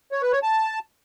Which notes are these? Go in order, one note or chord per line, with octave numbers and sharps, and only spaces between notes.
C#5
B4
C#5
A5